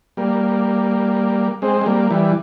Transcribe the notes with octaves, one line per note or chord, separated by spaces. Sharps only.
G3 A#3
G#3 C4
G#3
G3 A#3
E3 G3